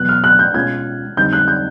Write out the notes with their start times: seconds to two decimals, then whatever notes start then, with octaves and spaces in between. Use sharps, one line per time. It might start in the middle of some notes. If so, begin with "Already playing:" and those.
Already playing: E2 B2 F#3 B3 F#6
0.09 F6
0.24 F#6
0.39 G6
0.54 B2 G#3 C#4 F4 G#6
1.17 F2 D3 G3 C4 D#4 G6
1.33 F#6
1.48 G6